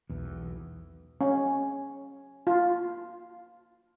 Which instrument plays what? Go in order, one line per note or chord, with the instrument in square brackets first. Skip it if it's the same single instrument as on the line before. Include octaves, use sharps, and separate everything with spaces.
[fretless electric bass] B1 E2
[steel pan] C#4
F4